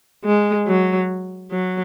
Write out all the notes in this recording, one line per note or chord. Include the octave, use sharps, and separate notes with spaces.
G#3
F#3
F#3